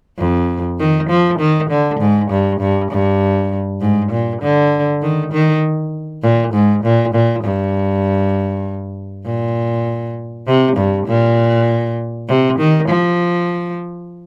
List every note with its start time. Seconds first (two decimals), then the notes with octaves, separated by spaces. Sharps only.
0.19 F2
0.79 D#3
1.10 F3
1.39 D#3
1.70 D3
2.00 G#2
2.31 G2
2.60 G2
2.91 G2
3.81 G#2
4.12 A#2
4.42 D3
5.02 D#3
5.33 D#3
6.23 A#2
6.54 G#2
6.84 A#2
7.14 A#2
7.44 G2
9.26 A#2
10.47 C3
10.77 G2
11.07 A#2
12.29 C3
12.59 D#3
12.89 F3